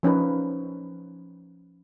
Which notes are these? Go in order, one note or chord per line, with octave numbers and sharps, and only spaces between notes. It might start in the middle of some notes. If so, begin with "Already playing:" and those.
F3 C#4 D#4 B4